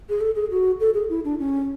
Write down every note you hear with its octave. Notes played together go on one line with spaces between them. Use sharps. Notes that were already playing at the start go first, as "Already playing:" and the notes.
G#4
A4
G#4
F#4
A4
G#4
E4
D4
C#4